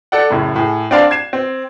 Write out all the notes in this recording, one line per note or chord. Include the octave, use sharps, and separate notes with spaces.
A4 D5 F#5
F#2 A2 C#3
A2 G#4
C4 D4 D5 F5 A5 C6
G#6 C7 E7
C4